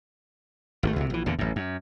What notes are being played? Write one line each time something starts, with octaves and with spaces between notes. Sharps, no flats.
G#1 D#3 A3
C#2 C3
A#1 E3
E2 A#2 D3
A1 F#2
F#2